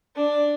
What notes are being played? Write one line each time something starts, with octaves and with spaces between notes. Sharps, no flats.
D4